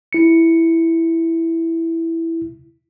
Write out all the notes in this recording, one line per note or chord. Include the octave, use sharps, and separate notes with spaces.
E4 C#7